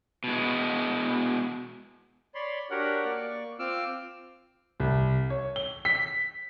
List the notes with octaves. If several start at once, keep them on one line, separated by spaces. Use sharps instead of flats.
B2 G#3
C#5 D5 B5 C6
D4 F#4 G4 A#4 C#5 F#5
A#3 D5 C#6
C4 F4 D6 E6 F6
C2
C#5
G7
B6